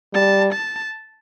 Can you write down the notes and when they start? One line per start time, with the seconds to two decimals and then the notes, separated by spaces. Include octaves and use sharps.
0.14 G3 A5
0.53 A5